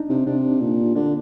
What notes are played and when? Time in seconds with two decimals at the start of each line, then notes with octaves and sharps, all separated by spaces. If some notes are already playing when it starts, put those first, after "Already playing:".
Already playing: D4 D#4
0.09 C3
0.26 C3 D4
0.60 A#2
0.95 D3 D4